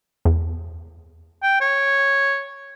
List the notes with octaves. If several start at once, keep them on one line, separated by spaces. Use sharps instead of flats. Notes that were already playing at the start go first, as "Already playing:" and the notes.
E2
G5
C#5